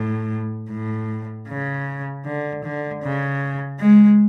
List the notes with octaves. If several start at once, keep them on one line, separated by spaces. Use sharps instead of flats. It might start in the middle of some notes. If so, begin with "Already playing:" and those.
Already playing: A2
A2
C#3
D3
D3
C#3
G#3